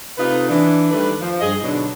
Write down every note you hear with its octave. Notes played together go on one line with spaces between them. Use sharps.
C3 A3 D#4 F4 B4
E3 D4
D#3 G3 A3 D4 B4 D5
F3
G2 G#4 D#5
B2 D3 F#3 D4 D#4